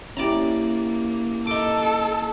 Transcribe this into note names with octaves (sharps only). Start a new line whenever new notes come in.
A#3 C#4 E4 G4 D5 A5 A#5
D#4 A4 D6